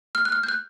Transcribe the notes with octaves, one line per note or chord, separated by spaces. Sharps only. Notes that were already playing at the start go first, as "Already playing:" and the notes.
F6
F#6
F6
G6
F#6